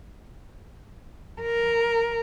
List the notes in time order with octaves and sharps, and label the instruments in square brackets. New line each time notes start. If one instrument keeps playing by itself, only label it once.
[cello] A#4